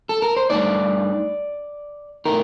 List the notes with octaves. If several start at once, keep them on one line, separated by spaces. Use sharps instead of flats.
A4
A#4
C5
G2 D#3 A3 D#4 D5
A2 A3 D#4 A#4